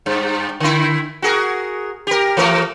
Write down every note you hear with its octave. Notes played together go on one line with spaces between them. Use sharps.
G2
D3 E4
F#4 G#4 A#4
G4 A#4
E3 A3 A#4